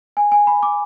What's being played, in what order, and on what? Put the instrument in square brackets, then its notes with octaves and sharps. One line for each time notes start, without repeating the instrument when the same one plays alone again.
[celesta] G#5
G#5
B5
D6